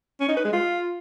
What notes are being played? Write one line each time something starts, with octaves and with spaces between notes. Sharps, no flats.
C#4
D#4
B4
G#3
F4